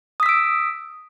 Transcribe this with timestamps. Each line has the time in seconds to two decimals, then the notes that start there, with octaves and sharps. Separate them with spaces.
0.20 D#6
0.23 B6
0.26 E6
0.29 D7